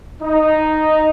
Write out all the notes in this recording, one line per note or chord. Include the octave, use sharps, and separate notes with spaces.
D#4